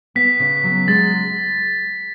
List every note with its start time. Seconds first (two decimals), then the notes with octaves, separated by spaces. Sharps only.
0.15 B3 B6
0.39 C#3
0.64 F#3
0.87 G#3 A6